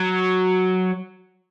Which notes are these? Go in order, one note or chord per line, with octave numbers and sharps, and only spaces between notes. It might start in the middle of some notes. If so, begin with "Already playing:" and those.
Already playing: F#3